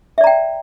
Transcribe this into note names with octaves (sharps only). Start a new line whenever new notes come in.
D5 E5 G5 A#5